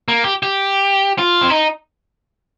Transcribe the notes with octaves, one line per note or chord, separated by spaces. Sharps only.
A#3
G4
G4
F4
C4
D#4